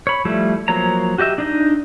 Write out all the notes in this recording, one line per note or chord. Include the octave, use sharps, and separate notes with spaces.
C#5 B5
F3 G3 A3 E4
F3 F#3 A#3 C#5 A#5
F#4 G4 D#5 E5
D4 D#4 D#5